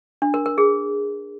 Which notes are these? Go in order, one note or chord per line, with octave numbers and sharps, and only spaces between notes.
D4
A#4
A#4
G#4